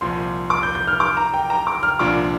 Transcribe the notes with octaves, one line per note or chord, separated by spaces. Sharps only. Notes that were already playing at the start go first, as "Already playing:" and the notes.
C2 A#2 F3 C6
D6
G6
G6
F6
D6
A#5
G5
A#5
D6
F6
C2 A#2 F3 D4 F4 D6